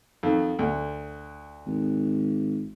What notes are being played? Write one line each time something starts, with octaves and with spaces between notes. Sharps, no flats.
F2 D#3
D2
G#1